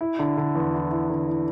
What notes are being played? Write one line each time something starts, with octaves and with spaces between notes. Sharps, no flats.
E4
D3
D3
E2
E4
E4
D3
E4